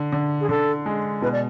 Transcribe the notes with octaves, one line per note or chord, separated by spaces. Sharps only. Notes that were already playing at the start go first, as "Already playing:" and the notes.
Already playing: D3
D3
G#4
D3 A4
G#3
B2 B4
D5